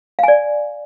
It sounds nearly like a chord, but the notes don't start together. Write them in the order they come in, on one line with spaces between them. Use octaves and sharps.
F5 G#5 D5